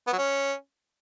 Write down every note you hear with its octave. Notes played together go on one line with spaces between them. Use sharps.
B3
F#3
C#4